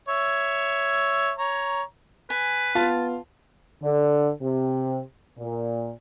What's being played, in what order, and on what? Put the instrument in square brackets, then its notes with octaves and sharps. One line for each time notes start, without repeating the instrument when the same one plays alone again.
[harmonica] C#5 E5
C#5 A#5
[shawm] B4 [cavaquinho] G#5
[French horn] B3 [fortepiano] F4 [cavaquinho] A5
[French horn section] D3
C3
A#2